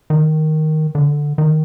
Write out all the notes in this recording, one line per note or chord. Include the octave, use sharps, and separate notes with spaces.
D#3
D3
D#3